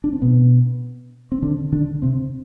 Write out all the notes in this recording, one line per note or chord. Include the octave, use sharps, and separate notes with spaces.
D4
C4
B2 B3
C4
D3 D4
D3 D4
C3 C4